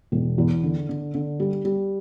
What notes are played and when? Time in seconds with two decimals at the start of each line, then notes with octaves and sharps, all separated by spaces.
0.12 E1
0.38 E2
0.63 D3
0.89 D3
1.14 D3
1.40 G3
1.65 G3